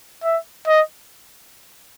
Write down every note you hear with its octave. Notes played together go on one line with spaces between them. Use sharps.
E5
D#5